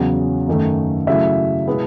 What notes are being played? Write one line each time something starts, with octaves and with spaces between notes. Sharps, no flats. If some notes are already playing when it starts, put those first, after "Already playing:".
Already playing: E2 C#3 F#3 C#4 F#5
F#2 D#3 A3
C#3 F#3 A3 E4 E5
B2 G#3 B3 E4